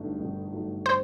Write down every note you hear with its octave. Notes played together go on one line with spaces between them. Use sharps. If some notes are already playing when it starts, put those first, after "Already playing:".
Already playing: G1 G2 F#3 A3 D#4
G1
G2 F#3 A3 D#4
C5